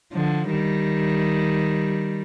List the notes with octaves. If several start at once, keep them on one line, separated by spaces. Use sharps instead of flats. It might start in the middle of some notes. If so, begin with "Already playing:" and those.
D3 F3
D#3 G3